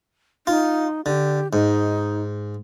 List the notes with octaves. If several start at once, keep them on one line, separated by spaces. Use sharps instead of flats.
D#4 F4
D3 G4
G#2 D#4